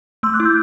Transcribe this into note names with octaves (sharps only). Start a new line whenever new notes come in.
A3 C6 E6
D6 F#6
E4
E6 G6